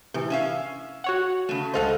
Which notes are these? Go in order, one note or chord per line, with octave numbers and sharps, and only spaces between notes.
A2 C3 E3
C#4 E5 F5
F#4 C#5 F#5
C#3 A3
C#2 A4 C5 D#5 F5 F#5